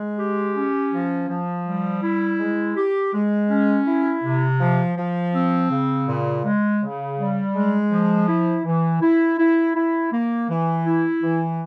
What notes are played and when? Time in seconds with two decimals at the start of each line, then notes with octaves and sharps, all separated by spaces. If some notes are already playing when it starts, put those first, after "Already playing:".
Already playing: G#3
0.19 G4
0.56 C#4
0.92 F3
1.29 F3
1.66 G3
2.03 E4
2.39 G#3
2.76 G4
3.13 G#3
3.50 C#4
3.87 E4
4.24 C3
4.60 F3
4.97 F3
5.34 C4
5.71 C#3
6.07 A#2
6.44 G#3
6.81 C#3
7.18 G3
7.55 G#3
7.91 F3
8.28 E4
8.65 E3
9.01 E4
9.39 E4
9.75 E4
10.12 A#3
10.49 E3
10.86 E4
11.23 E3